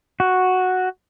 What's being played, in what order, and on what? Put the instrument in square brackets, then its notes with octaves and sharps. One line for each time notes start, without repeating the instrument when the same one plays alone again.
[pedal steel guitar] F#4